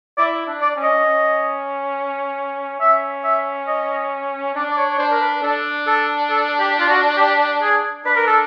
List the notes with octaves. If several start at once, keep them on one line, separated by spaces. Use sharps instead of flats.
E4 D5
D4
D5
C#4
D#5
C#4
C#4 E5
E5
D#5
D4 D5
D5
C#5
C#5
D4 C5
A#4
B4
D4 A4
A4
A4
G4
F4
F#4
G4
G#4
D4 B4
A#4
A4